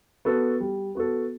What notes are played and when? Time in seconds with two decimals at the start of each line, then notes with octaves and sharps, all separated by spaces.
0.25 B3 F#4 A4
0.60 G3
0.95 B3 F#4 A4